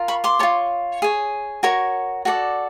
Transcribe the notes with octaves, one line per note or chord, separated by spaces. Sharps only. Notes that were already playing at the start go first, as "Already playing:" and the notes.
Already playing: F4 A#4
B5 C#6
C6 D6
F4 A4 C#5
G#4 C#5
F#4 A#4 C#5 C#6
F#4 A4 D5